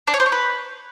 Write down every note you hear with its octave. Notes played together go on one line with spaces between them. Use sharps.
D4
C#5
C5
C#5
B4